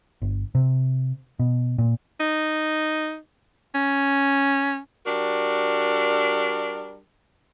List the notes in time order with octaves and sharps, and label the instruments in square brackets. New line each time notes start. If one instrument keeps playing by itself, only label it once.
[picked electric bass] G1
C3
B2
A#2
[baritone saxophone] D#4
C#4
[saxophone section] G3 D4 F#4 A#4